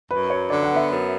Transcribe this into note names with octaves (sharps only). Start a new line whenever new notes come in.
F#2 B4
F#3 C#5
D3 D5
F#5
B3
E5
F#2